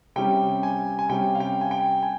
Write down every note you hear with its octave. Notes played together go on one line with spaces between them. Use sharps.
C3 G3 C#4 G5
G#5
G#5
C3 G3 C#4 G5
F5
G5
G#5
G5
G#5